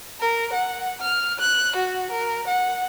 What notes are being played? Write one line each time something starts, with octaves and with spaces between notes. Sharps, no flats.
A#4
F#5
F6
F#6
F#4
A#4
F#5